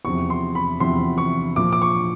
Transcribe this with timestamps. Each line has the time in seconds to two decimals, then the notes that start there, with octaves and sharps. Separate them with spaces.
0.05 E2 C3 F3 C#6
0.30 C6
0.55 B5
0.80 E2 C3 F3 C6
1.18 C#6
1.56 A#2 F3 D6
1.72 D6
1.82 C#6